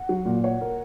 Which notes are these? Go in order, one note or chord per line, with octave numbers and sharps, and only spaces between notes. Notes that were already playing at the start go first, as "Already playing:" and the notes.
Already playing: F#5
F#3
A#2
C#5 F#5
A#4